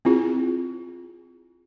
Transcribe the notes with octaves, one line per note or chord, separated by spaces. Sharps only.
C4 E4 F4 G#4